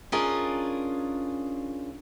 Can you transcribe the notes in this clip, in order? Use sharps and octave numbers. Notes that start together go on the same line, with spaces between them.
C#4 D4 F4 G#4 A#4 D#5